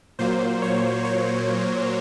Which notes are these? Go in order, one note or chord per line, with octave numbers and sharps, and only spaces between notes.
A#2 F#3 A#3 C5
C#5
C#5